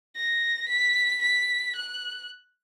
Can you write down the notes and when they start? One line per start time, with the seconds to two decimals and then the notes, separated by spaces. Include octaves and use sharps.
0.16 A#6
0.69 B6
1.22 B6
1.76 F#6